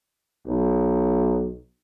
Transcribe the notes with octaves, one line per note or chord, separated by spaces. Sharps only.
B1